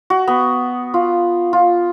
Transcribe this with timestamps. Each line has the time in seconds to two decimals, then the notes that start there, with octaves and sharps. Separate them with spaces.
0.10 F#4
0.28 B3
0.94 F4
1.53 F4